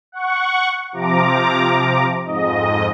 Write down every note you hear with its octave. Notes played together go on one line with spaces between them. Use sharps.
F#5 C#6
C3 F3 A#5 D6
F2 G#2 D#5